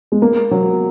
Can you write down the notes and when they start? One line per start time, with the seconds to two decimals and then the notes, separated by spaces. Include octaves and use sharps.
0.12 G#3
0.22 A#3
0.51 F#3